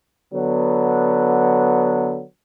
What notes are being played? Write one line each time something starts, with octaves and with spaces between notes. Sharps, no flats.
D3 F#3 B3